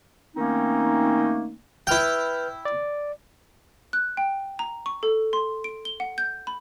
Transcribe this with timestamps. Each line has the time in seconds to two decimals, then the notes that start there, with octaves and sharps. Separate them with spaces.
0.36 D#3 A3 A#3 C4 C#4 D#4
1.87 E4 B4 G5 F6 G6
2.65 D5
3.93 F#6
4.17 G5
4.59 A#5
4.86 C#6
5.03 A4
5.33 C6
5.64 D7
5.85 G7
6.00 F#5
6.18 G6
6.47 B5